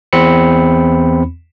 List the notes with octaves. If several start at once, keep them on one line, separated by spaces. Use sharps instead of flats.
E2 C4 B5 C#7